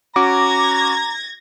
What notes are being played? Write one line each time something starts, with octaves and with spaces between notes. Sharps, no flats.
C#4 F#4 A#5 D6 G#6 A#6